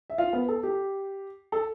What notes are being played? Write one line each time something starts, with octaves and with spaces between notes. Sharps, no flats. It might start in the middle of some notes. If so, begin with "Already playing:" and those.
E5
F4 F5
B3 B4
A4
G4
A4